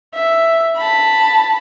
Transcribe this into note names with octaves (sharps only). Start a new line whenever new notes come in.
E5
A5 B5